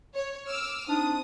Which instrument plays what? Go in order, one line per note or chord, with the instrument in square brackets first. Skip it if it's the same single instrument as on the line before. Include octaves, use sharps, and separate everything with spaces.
[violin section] C#5
D6 E6 F6
[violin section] C4 D#6 [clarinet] D4 [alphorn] D#4